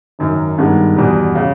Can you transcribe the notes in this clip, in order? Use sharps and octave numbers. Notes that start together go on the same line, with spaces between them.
G#1 F#2 D#3
G2 D#3 G#3 B3
E2 B2 G3
C#3